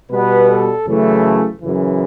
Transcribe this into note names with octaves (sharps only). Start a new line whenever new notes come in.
B2 G3 B3 B4
A4
F#2 C#3 E3 A3
F#2 C#3 E3